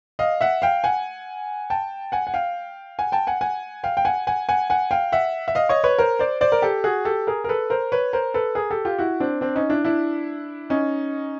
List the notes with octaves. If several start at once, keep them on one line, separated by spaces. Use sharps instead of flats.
D#5 F5
E5 F#5
F5 G5
F#5 G#5
G5 A5
F#5 G#5
F#5
F5 G5
F#5 G#5
G5 A5
F#5 G#5
F#5 G#5
F5 G5
G5
F#5 G#5
F#5 G#5
F#5 G#5
F#5 G#5
F5 G5
E5 F#5
E5
D#5 F5
C#5 D#5
B4 C#5
A#4 C5
C5 D5
C5 D5
A#4
G4 A4
F#4 G#4
G4 A4
G#4 A#4
A#4
A4 B4
A#4 C5
B4 C#5
A#4 C5
A4 B4
G#4 A#4
G4 A4
F4 G4
E4 F#4
C4 D4
C4 D4
C#4 D#4
D4 E4
D4 E4
C#4 D#4